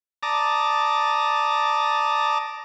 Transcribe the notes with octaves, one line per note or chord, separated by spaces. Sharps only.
D5 A5 A#5 D6 D#6